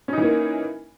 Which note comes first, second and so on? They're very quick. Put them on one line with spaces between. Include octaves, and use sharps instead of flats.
C#4 D#4 E3 A#3